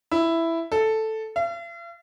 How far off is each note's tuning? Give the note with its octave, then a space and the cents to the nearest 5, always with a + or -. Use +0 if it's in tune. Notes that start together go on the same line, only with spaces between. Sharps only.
E4 +5
A4 +0
F5 -45